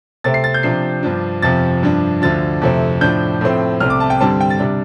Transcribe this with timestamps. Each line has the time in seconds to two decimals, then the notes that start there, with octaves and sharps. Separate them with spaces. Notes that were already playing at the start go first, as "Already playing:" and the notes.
0.24 C3 A3 C4 A6
0.34 C7
0.44 A6
0.54 G6
0.63 C3 F3 D4 C7
1.03 G2 F3 D4
1.42 F2 C3 F3 A6
1.83 G2 F3 D4
2.22 D2 D3 F3 D4 A6
2.61 F2 C3 A3 C4
3.01 A2 F3 D4 G6
3.41 A2 F3 A3 C4
3.80 C2 C3 A3 C4 F6
3.90 D6
4.00 A5
4.10 G5
4.21 G2 D3 G3 C4 A5
4.41 G5
4.50 A6
4.59 C3 G3 D4